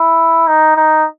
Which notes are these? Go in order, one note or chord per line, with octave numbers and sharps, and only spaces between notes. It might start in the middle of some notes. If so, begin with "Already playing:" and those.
Already playing: E4
D#4
D#4